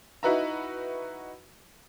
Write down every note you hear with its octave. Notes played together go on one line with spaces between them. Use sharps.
D#4 E4 F#4 B4 E5 A#5